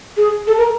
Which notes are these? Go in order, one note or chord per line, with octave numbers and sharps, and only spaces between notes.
G#4
A4
A#4